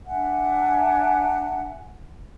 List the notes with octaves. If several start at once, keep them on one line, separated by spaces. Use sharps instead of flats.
D4 E5 F#5 G#5